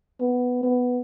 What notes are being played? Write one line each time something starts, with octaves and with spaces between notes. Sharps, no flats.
B3
B3